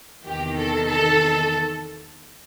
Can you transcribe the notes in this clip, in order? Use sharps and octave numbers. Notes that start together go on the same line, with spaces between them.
E2 C3 D#3 G4
A4
A4